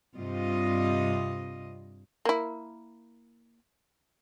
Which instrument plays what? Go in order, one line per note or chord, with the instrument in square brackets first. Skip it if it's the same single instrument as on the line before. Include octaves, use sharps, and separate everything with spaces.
[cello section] G2 C3 G3 F4 D#5
[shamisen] A#3 E4